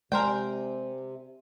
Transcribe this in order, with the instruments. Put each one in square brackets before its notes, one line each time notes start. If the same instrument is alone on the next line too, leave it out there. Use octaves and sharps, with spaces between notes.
[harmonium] C3 [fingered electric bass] G#3 [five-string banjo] A#4 C5 G5 [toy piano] D5 G#5